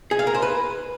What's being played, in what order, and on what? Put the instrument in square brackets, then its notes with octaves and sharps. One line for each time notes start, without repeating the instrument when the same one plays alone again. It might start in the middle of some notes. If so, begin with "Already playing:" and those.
[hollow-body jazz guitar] G#4
F5
A#4
C5
B4